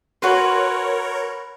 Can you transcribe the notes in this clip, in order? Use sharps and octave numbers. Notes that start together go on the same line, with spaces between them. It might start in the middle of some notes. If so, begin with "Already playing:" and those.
F#4 A#4 B4 C#5 C6